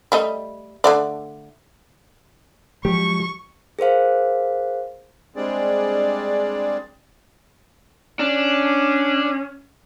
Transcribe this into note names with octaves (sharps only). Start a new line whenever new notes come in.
G3 A3 D#5
D3 A3 D5
F3 F#3 G#3 G4 C#6
G#4 A#4 C5 F5
G3 G#3 C4 D4 G#4 D5
C#4 D4